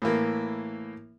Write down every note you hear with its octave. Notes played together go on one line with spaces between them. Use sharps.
A2 E3 A#3